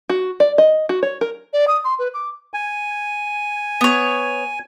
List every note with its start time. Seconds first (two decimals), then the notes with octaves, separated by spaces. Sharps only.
0.09 F#4
0.40 D5
0.58 D#5
0.89 F#4
1.03 C#5
1.21 A#4
1.53 D5
1.68 D#6
1.84 C6
1.99 B4
2.14 D6
2.54 G#5
3.81 B3 C#5